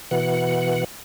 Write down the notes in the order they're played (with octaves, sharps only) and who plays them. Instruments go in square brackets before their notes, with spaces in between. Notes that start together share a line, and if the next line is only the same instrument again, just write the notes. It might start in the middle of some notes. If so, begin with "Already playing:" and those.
[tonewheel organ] B2 E3 F#5